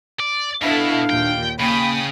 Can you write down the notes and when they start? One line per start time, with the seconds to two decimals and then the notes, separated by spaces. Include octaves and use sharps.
0.20 D5
0.62 B2 D4 E4 A4 F5
1.10 D#2 A#2 G5
1.60 C#3 A#3 G5 B5 D#6